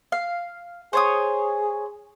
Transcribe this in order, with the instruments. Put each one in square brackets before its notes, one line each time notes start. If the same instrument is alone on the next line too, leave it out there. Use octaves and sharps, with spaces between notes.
[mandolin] F5
[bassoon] G#4 [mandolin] C5 C#5 D#6